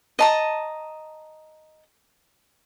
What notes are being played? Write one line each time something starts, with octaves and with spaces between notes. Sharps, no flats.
D#5 A5 A#5